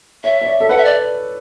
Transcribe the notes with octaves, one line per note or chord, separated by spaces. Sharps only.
C#5 E5
C#5
D5
A4
B4 F#5
E5
D5